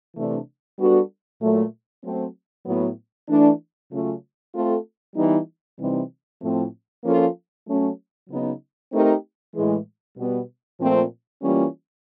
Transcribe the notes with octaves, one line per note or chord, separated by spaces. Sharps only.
C3 E3 A3 D4
G3 B3 D4 F#4 A4
A#2 F#3 A3
F#3 A3 C4
A2 F#3 B3
E3 A3 D4
C#3 F#3 A3 C#4 F4
A3 C4 F4 A4
E3 G3 B3 D#4
C3 E3 G3 C4 D#4
A2 F3 A3 C4
F3 A#3 C#4 F4 A4
F#3 A3 C#4
C#3 F#3 B3 D#4
A3 C4 D#4 G4 A#4
A2 E3 G#3
B2 G3 B3
A#2 F3 A3 C4
E3 G3 A#3 C#4 F4